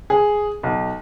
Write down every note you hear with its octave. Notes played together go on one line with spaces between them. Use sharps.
G#4
B1